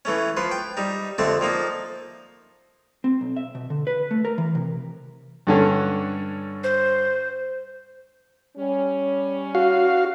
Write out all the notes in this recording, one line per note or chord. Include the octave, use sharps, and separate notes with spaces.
E3 A3 C#4
F3 B4 C6
G5
G3 D#4
F2 D3 A3 C4 A5
F3 A#3 D#4
C4
B1
E5
B2
D3
B4
A3
A#4
E3
C3
G2 D3 C#4
C5
G3 C#4
F#4 F5